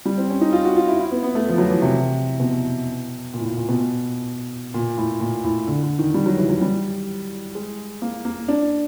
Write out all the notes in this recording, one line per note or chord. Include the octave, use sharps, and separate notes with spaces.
G3
C4
C#4
D#4
F4
F#4
F4
E4
E4
B3
B3
A3
F3
F#3
E3
C3
B2
A#2
A2
A#2
A#2
B2
A#2
A2
A#2
A2
D3
D3
D#3
G3
F#3
E3
F#3
G3
G#3
A#3
A#3
D4